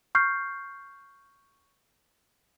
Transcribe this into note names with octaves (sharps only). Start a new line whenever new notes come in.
C#6 F6 G6 C7